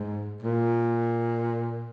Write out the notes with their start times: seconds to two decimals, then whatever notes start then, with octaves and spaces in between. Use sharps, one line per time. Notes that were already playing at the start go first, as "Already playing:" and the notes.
Already playing: G#2
0.42 A#2